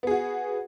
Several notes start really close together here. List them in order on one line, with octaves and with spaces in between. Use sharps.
B3 G#4 F#4